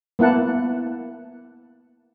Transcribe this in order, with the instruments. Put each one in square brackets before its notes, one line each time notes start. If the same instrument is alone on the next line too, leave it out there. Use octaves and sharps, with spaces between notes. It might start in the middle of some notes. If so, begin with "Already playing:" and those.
[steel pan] A#3 B3 E4 F#5 A5